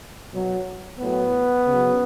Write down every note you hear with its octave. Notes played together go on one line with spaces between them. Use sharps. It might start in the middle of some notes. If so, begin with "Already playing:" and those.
B2 F#3
A2 F#3 B3
C#3
F#3